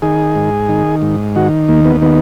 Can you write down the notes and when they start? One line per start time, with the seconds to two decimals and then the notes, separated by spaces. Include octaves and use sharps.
0.02 D#3 G#4
0.35 G#2
0.69 D#3
1.02 G#2
1.35 D#3 F#4
1.69 D#2 A#3
1.85 B3
2.02 D#3 B3